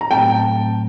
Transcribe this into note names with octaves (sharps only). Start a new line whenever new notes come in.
A#5
A2 F#3 A3 C4 G5 A5